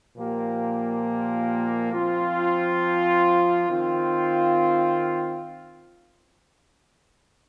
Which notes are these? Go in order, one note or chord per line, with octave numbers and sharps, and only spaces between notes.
A#2 F3 A#3 G4
F3 C4 F4
D#3 C4 F4